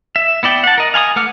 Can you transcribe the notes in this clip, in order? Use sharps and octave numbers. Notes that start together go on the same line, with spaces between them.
E5
B3 E4 D5 G5
F#5 A5
A#4 D#5
F5 G#5 B5 D#6
A3 B4 F#5 D6 F6